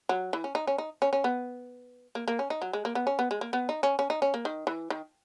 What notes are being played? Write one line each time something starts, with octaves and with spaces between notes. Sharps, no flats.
F#3
E3
C#4
D#4
C#4
D#4
C#4
C#4
B3
A#3
A#3
C#4
D#4
F#3
G#3
A#3
B3
C#4
B3
G#3
A#3
B3
D#4
C#4
C#4
D#4
C#4
A#3
D#3
E3
D#3